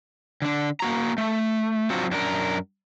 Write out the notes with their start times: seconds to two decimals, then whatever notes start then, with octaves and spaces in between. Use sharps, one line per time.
0.42 D3 D4
0.80 A#3 F#4 A#5
1.18 A3
1.90 F#3 C4 D4 F4 F#4
2.11 F#2 D4 A#4